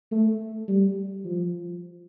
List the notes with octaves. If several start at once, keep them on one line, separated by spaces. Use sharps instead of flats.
A3
G3
F3